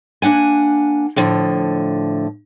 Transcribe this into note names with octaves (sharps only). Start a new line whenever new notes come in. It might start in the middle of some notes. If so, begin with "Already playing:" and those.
A#3 D4 F#5 G#5
A2 D3 F3